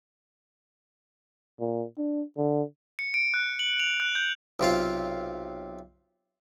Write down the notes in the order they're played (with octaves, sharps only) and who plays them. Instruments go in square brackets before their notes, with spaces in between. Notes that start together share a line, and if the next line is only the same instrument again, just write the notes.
[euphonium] A#2
D4
D3
[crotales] C#7
D7
F#6
F#7
F7
F#6
G6
[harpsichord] B1 C3 F4 F5